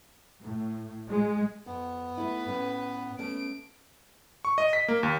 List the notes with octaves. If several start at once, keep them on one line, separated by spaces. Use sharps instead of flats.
A2
G#3
F2 B3
A3 E4 B4
A2 C#4
A3 B3 C#4 D7
C#6
D#5
B6
A#3
D#2